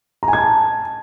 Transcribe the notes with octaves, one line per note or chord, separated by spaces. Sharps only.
A#5
G#5
G#6
A5